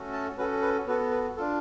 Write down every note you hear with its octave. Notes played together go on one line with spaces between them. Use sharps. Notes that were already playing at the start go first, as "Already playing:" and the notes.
Already playing: A3 C#4 F#4 A4
A5
C#4 F#4 A4 B4
B4
B3 F#4 A4 B4
B4
D4 F4 A4